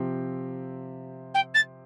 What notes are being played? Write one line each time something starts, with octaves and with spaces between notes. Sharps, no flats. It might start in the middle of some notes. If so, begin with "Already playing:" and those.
Already playing: C3 F3 C4 G4
G5
A6